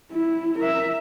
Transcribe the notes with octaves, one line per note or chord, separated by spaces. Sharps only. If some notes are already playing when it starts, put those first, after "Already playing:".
E4
A#4 E5